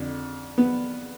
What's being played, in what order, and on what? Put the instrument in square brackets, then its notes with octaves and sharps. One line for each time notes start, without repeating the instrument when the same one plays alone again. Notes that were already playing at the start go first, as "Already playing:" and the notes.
Already playing: [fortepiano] F2 D3
B3